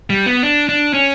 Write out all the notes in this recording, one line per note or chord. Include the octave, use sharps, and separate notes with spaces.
G3
B3
D4
D4
C#4